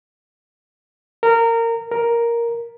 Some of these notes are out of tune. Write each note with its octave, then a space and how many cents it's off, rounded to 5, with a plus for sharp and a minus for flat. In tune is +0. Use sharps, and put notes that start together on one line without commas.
A#4 -20
A#4 +5